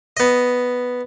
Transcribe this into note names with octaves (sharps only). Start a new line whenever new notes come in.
B3 D#5